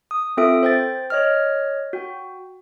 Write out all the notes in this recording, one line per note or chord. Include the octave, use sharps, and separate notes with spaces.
D#6
C4 F4 A4 E5 D#6 D7
C5 G5 A6
C#5 D#5 F6
F#4 G5